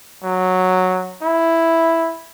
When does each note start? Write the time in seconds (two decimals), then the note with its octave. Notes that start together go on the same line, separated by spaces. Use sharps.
0.24 F#3
1.22 E4